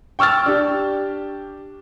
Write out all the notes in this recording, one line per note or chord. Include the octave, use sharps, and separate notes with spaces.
G5 C#6 E6 F6 A6
D4 G4